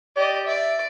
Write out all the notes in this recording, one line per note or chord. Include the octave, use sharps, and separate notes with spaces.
G4 D5 D#5
D5 E5